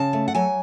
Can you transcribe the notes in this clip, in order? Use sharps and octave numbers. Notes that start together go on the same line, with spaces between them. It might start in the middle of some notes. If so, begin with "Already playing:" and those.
Already playing: C#3 A5
A3
F#5
F#3 G#5